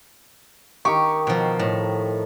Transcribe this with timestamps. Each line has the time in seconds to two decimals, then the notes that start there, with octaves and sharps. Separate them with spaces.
0.85 D#3 G4 C#6
1.27 B2 F3
1.59 A2